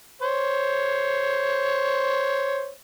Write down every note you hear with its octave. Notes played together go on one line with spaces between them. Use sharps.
C5 C#5